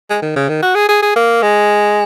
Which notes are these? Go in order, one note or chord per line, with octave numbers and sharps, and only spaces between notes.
G#3
D#3
C#3
D#3
F#4
G#4
G#4
G#4
A#3
G#3